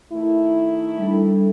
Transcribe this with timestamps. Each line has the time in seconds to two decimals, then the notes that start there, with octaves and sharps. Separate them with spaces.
0.12 D#3 A3 E4
0.98 G3 D4 A4